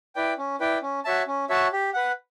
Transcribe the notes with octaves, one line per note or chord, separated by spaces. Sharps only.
E4 B4 D5 G5
C#4
E4 B4 D5 G5
C#4
F#4 C#5 E5 A5
C#4
F#4 C#5 E5 A5
G4
B4 F#5